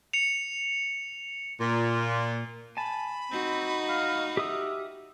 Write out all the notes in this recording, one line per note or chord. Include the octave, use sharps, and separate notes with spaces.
C#7 F7
A#2
G#5 A5 B5
C4 D#4 F#4
F5
G4 E5 D#6 F6